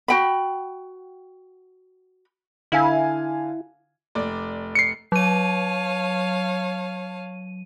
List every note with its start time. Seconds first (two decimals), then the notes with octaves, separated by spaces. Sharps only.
0.08 F#4 G5 B5
2.72 D3 E4 F5 G#5
4.15 F1 D5
4.75 C7 C#7
5.12 F#3 C#5 F5 A5 D#7